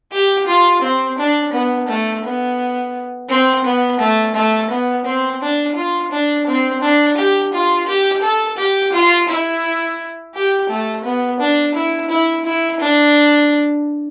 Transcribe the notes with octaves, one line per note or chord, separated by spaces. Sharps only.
G4
F4
C4
D4
B3
A3
B3
C4
B3
A3
A3
B3
C4
D4
F4
D4
C4
D4
G4
F4
G4
A4
G4
F4
E4
G4
A3
B3
D4
E4
E4
E4
D4